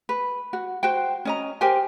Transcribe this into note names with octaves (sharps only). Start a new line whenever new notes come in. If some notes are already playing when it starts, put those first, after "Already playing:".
B4
F#4
F#4 C5 G5
C#4 D#5 A#5
G4 A#4 C5 G#5